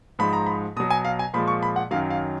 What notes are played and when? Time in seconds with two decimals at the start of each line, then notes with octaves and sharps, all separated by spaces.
0.19 G#2 F3 G#3 B5
0.33 A#5
0.47 B5
0.76 B2 D#6
0.80 F#3
0.90 G#5
1.05 F5
1.19 G#5
1.34 A#2 F3 G#3 B5
1.47 C#6
1.63 B5
1.76 F#5
1.91 F#2 D#3 F#3 F5
2.10 F5